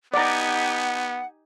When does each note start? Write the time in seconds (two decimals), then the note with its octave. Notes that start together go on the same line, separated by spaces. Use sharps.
0.14 B3 D#4 G4 D5 F#5 G#5 A#5